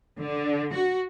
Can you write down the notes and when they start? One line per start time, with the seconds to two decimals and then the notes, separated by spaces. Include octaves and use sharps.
0.20 D3
0.74 F#4